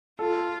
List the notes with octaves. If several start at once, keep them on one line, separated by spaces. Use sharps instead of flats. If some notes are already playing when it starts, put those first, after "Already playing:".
F4 A4